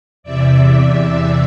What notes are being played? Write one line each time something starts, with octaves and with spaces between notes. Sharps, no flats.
E2 C3 E3 D5 E5
D5 E5
D5 E5